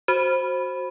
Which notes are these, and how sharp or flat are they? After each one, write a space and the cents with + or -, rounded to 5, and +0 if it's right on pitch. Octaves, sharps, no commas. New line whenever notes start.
F#4 +0 C5 +10 B5 +0